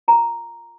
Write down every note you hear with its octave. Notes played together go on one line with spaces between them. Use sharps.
F4 A#4 A#5